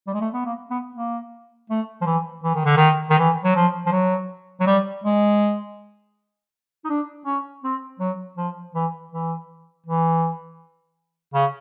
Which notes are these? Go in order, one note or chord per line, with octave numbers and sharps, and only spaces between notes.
G3
G#3
A3
B3
A#3
B3
A#3
A3
F3
E3
E3
D#3
D3
D#3
D#3
E3
F#3
F3
F3
F#3
F#3
G3
G#3
D#4
D4
C#4
C4
F#3
F3
E3
E3
E3
C#3